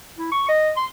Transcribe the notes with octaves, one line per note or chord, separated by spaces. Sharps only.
E4
C#6
D#5
C6